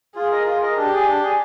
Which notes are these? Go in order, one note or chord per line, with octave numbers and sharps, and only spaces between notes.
F4 G#4
A#4 D#5
F4
A#4 D#5
D4 G4
G#4 D5 G#5
D4
G#4 D5 G#5